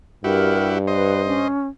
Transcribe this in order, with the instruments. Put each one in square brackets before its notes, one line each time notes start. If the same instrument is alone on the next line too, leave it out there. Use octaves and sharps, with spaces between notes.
[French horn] G2 [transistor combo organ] E4 F#4 G4 [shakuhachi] A#4
[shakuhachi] B4 [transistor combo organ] C5 D#5
[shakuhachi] C#4